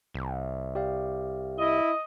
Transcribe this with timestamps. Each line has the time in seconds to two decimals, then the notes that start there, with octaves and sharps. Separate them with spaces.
0.14 C2
0.75 G4 D5 F5
1.59 E4 D#5